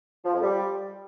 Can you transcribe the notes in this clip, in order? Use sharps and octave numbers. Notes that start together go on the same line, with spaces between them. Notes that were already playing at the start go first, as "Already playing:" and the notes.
F3
F2
G3